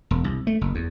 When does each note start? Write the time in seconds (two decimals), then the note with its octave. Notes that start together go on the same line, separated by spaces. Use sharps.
0.11 E1
0.24 C2
0.47 A3
0.61 F#1
0.75 E2